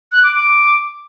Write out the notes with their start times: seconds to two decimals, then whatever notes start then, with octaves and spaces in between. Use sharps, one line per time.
0.12 F#6
0.23 D6
0.35 D6